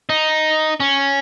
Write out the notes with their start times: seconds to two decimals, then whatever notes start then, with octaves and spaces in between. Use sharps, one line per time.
0.09 D#4
0.80 C#4